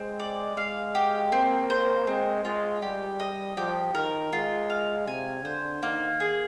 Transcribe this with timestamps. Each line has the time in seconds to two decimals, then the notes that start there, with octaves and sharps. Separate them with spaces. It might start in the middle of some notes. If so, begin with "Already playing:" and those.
Already playing: G#3 C4
0.20 D5
0.57 G#3 F5
0.95 G4
1.32 A#3 C4
1.70 C5
2.07 G#3 C4
2.45 G#3 F4
2.82 G3 G4
3.20 D#5
3.57 F3 G4
3.94 D#3 A#4
4.33 G#3 F4
4.70 F5
5.07 C3 G#5
5.44 D3 C5
5.82 D#3 A#3
6.20 G#4